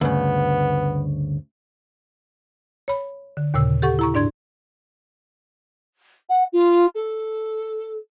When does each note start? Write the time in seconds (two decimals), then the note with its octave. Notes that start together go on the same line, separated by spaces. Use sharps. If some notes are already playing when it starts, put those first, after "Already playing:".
0.01 D2 G2 C#3 B3
2.88 C#5 B5
3.37 D3
3.54 D#2 A#2 C#3 E6
3.82 G4 A4 F#5 C#6
3.99 E4 A#5 C#6
4.14 G#2 D4 D5 C6 G#6
6.29 F#5
6.52 F4
6.95 A4